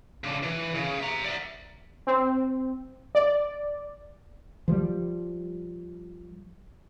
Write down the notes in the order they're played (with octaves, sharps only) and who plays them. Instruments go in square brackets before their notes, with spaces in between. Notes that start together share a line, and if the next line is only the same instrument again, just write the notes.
[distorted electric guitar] C#3 D4
E3
C#3
E5 A#5
D5 E5
[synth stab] C4
D5
[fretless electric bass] F3 G3